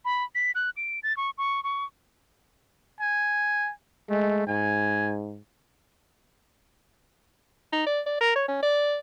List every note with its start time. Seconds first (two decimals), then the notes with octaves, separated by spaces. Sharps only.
0.05 B5
0.35 B6
0.55 F#6
0.77 D7
1.03 A6
1.17 C#6
1.38 C#6
1.64 C#6
3.01 G#5
4.10 G#3 A3
4.47 G#2 G#5
7.73 D#4
7.86 D5
8.06 D5
8.21 A#4
8.36 C#5
8.48 C#4
8.63 D5